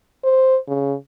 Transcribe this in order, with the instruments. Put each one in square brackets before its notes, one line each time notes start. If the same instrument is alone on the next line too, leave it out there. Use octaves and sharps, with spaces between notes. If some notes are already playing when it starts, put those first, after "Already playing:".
[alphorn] C5
C#3